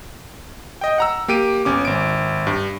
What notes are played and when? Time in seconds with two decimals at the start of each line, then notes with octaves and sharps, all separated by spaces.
0.81 D#5 G5
0.98 F#5 A#5 E6
1.28 A#3 G4 D7 D#7
1.65 G1 C#4 D6
1.85 G#1 D7
2.47 G2